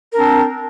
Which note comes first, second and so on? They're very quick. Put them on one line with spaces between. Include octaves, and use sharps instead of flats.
A#4 D4 C4